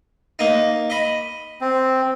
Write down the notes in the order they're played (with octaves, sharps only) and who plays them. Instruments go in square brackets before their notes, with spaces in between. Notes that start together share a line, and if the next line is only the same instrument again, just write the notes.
[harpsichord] A#3 D#4
D#5 B5
[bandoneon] C4